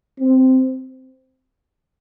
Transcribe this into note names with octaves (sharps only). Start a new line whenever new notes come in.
C4